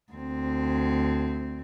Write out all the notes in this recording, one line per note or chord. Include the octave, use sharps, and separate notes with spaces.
D2 C4